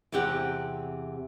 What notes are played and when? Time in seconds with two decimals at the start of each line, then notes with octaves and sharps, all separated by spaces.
0.12 E2 C3 C4 G4 F#5